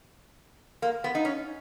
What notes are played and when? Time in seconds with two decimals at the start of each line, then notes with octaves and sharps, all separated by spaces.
0.82 A#3
1.04 B3
1.15 D#4
1.25 C#4